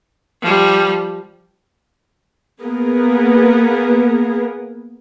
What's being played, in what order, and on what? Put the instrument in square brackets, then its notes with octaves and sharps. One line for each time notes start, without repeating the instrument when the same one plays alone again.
[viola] F3 G3
[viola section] A#3 B3 G#4 A#4